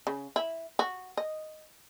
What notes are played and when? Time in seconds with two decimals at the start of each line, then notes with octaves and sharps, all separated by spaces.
0.07 C#3
0.36 E4
0.79 F#4
1.17 D#5